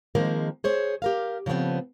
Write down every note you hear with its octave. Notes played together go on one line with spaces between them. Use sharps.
D#3 F3 G#3 A#3 C4 A#4
G#4 C5 C#5
G4 A#4 F5
C#3 F3 A3 B3 C4